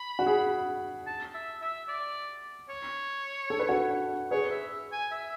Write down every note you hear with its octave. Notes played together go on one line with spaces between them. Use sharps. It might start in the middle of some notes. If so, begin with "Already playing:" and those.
Already playing: B5
F#4
G#4
A5
E5
E5
D5
C#5
A4
B4
F#4 A4
G#4 B4 C#5
E5
G#5
E5